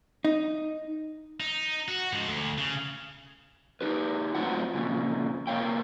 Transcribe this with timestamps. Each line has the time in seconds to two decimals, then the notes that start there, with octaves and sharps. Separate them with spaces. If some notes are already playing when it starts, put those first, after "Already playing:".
0.25 D#4
1.40 D#4
1.88 F#4
2.12 G#2 F3
2.27 D2
2.58 C#3
3.81 D#4 G4 B4
4.35 A2 F#3 C4 F4 F#5
4.75 F2 A#2 C#3
5.47 C3 A#3 A4 C#5 F5 G5